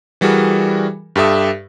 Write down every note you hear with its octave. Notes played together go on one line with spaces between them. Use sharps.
E3 G3 F#4 G#4 A#4
G2 G4 A4 E5 D#6